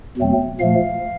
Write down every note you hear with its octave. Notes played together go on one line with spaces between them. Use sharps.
E2 B2 F#3 A3 C4
A#2 F3 A3 F5